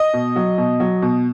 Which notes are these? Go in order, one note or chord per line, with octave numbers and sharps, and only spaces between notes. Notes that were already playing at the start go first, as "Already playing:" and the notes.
Already playing: D#5
B2
F#3
B2
F#3
B2